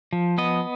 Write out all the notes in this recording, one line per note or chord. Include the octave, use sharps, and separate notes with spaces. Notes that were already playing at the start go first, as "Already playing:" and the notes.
F3
B3 D#5